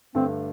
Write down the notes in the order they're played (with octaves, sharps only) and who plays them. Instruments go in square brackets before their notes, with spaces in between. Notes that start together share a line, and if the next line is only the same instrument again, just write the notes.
[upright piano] G2 D3 A3 D4 [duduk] C4